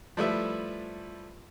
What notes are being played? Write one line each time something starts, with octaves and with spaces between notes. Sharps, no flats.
F3 G3 A3 E4 B4 E5